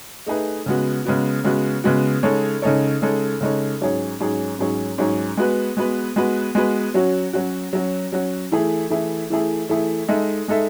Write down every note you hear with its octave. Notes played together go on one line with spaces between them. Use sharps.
A3 D#4 G#4 B4
C#3 G#3 B3 F#4
C#3 G#3 B3 F#4
C#3 G#3 B3 F#4
C#3 G#3 B3 F#4
C#3 G#3 D#4 A4 C#5
C#3 G#3 D#4 A4 C#5
C#3 G#3 D#4 A4 C#5
C#3 G#3 D#4 A4 C#5
G#2 F#3 C#4 G#4 C#5
G#2 F#3 C#4 G#4 C#5
G#2 F#3 C#4 G#4 C#5
G#2 F#3 C#4 G#4 C#5
G#3 B3 F#4 B4
G#3 B3 F#4 B4
G#3 B3 F#4 B4
G#3 B3 F#4 B4
F#3 C#4 F#4
F#3 C#4 F#4
F#3 C#4 F#4
F#3 C#4 F#4
E3 A3 E4 G#4
E3 A3 E4 G#4
E3 A3 E4 G#4
E3 A3 E4 G#4
G#3 D#4 A4 E5
G#3 D#4 A4 E5